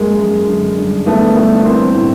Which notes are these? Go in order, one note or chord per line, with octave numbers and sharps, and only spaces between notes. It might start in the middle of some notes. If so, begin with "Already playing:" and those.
Already playing: F#2 G#3 A#3
F#2
D3
G2
D3 A3 B3
G2 A3 B3
B3
E3 A#3 C4
A2